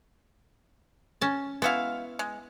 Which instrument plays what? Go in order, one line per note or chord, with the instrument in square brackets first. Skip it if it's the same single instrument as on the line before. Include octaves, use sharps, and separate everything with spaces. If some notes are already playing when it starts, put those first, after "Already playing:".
[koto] C#4 A5
[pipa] G#3 F#4 F5 [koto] B3 E4
[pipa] G#3